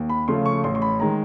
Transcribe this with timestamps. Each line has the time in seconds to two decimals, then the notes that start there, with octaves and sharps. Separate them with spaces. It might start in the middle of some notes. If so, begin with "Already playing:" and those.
Already playing: D#2
0.09 B5
0.28 C#3 F3 A3 C#4 C6
0.46 C#6
0.64 A1 C6
0.75 C6
0.82 B5
1.00 D#3 G#3 A#5